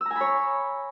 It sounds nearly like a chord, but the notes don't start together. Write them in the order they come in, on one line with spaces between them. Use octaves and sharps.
E6 A#5 G#5 B5 C#5